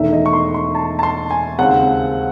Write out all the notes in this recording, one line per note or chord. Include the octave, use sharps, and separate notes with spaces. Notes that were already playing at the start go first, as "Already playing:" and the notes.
Already playing: E1 E2 D#3 A3 D#4 E5
D#5
C#6
C6
C6
A5
A5
C6
G#5
D#2 C#3 G#3 C4 F#5